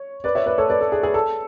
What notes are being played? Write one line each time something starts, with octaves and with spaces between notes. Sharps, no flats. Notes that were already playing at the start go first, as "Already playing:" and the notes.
Already playing: C#5
B4 D5
C#5 E5
B4 D5
A4 C#5
B4 D5
A4
G#4
G#4
A4